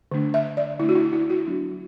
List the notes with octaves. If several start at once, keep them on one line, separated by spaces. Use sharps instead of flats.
D3 A3 D4
E5
D5
D3 A3 D4 E4
F#4
E4
E4
F#4
F#3 B3 D4